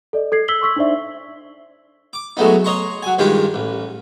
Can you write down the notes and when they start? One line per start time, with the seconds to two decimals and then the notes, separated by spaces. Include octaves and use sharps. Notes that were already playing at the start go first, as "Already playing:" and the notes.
0.13 A4 D5 D#5
0.32 A4 G#6 C7
0.48 E6 B6 F#7 G7
0.61 C6 C#6 E6 B6
0.76 D4 D#4 C5 D5 E5
2.13 D6
2.37 F#3 G#3 A3 B3 D#4
2.64 C#5 D#5 A#5 C6 C#6
3.03 F#3 G#5
3.18 G2 D#3 G#3 F4 G4 G5
3.54 A1